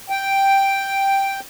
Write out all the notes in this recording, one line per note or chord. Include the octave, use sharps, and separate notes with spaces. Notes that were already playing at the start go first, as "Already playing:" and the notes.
G5